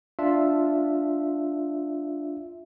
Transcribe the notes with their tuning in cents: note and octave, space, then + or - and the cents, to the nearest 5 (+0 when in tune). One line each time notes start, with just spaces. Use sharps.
D4 -5 F4 +0 E5 +0